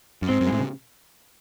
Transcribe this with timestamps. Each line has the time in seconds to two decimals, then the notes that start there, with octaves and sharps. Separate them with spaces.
0.22 F#2
0.29 G#2 C4
0.41 F#2
0.47 G#3
0.52 A2
0.59 C#3